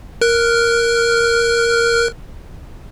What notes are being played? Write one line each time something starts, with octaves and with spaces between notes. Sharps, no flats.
A#4 F6 F#6